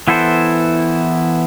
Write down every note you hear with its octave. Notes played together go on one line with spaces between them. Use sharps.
E3 B3 E4 A4 C5